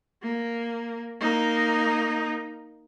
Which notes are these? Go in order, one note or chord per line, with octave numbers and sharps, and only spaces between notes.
A#3
A#3 D#4